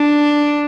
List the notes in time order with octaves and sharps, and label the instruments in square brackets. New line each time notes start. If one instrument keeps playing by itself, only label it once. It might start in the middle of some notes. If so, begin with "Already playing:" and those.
Already playing: [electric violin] D4